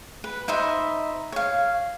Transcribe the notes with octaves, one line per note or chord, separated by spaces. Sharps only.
B4
D#4 C5 E5 B5
C#5 F5